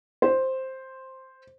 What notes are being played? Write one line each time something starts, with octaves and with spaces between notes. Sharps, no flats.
C5